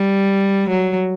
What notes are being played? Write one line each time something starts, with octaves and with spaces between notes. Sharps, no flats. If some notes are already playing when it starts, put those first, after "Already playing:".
Already playing: G3
F#3